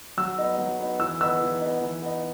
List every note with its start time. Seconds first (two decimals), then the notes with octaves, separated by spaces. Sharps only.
0.17 F#3 E6
0.38 B3 D#4
0.58 F#3
0.79 B3 D#4
0.99 E3 E6
1.21 B3 D#4 E6
1.41 E3
1.61 B3 D#4
1.81 E3
2.02 B3 D#4